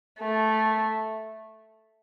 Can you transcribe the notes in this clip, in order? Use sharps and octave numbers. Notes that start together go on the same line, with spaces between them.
A3